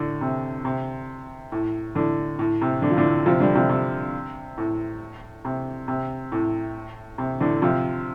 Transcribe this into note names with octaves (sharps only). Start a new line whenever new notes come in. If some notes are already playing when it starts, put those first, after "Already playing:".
Already playing: A2 D3
C3
C3
A2
A2 D3
A2
C3
D3
F3
A2 D3
C3 F3
D3 G3
C3 F3
C3
A2
C3
C3
A2
C3
A2 D3
C3 F3